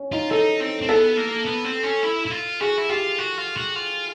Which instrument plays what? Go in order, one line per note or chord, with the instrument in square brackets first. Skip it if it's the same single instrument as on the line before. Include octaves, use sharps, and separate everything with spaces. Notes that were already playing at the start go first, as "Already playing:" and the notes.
Already playing: [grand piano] C#4
[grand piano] D#4 [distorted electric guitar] F4
[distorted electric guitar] D#4 [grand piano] A4
[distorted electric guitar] C4
C4
[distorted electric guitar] B3 [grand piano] A4
[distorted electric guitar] A#3
B3
C4
C#4
E4
E4
F4
[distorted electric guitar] F#4 [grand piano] G#4
[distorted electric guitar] E4
[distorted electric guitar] F4 [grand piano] G4
[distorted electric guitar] F#4
F4
F#4
F4